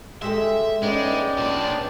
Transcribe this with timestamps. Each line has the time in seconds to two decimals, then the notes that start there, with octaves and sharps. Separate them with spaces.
0.22 G#3 G4 A4 E5
0.83 G#3 B3 C#4 D#4 D5 G5
1.38 A#2 D4